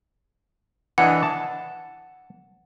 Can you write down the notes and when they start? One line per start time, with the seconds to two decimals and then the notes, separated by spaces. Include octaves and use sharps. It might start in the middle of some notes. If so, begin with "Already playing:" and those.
0.98 E3 D4 D#5 F#5
1.23 A5